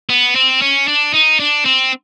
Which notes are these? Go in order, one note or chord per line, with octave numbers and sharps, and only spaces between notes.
B3
C4
C#4
D4
D#4
D4
C4